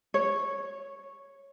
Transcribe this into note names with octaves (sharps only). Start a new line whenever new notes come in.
C#5